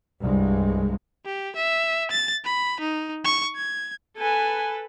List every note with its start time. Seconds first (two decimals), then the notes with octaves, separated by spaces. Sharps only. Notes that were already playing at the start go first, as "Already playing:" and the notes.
0.21 C2 G2 G#3
1.26 G4
1.56 E5
2.11 A6
2.44 B5
2.80 D#4
3.24 C#6
3.56 G#6
4.18 A4 B4 G#5